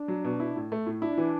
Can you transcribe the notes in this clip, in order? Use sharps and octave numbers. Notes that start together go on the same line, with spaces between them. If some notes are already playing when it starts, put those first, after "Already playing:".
Already playing: D4
F#3
B2
E4
A2
A3
A2
D4 E4
E3